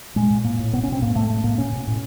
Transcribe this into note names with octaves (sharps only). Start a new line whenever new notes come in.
A#2 G#3
A#2
A2 A#3
A2
B2 B3
C#4
B2 C4
A2 A#3
A2 A3
A2 A3
A2 A#3
B2 C#4
B2
A2